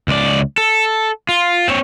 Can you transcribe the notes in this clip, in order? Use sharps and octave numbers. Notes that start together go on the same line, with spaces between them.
C#2 D5
A4
F4
C4 C#5